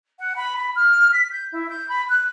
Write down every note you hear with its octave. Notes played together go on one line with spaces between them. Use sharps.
F#5
B5
B5
F6
B6
G6
E4
G6
B5
F#6